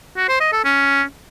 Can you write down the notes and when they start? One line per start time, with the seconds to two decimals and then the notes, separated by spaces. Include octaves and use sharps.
0.17 F#4
0.28 C5
0.40 D#5
0.52 A4
0.64 C#4